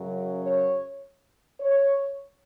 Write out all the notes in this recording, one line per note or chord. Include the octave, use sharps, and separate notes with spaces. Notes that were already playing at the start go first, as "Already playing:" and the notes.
Already playing: F#2 C#3 F#3
C#5
C#5